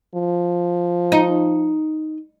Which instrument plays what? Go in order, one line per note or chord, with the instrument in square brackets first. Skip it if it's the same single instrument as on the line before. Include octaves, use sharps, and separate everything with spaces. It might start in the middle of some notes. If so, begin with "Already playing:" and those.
[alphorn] F3
[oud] D#4